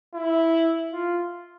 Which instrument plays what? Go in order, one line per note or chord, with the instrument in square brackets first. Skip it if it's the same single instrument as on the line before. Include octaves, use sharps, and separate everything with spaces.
[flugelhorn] E4
F4